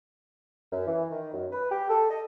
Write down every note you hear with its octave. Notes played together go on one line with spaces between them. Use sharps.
F#2
E3
D#3
F#2
B4
G4
A4
D#5